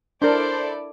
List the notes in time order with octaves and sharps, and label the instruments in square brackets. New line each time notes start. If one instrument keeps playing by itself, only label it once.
[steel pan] D4 A#4 [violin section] E4 A4 D5 [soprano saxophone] C5